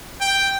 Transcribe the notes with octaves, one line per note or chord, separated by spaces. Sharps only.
G5